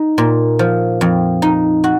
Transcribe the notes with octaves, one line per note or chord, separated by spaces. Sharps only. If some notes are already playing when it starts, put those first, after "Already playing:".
Already playing: D#4
A#2
F3
F2
D#4
F#4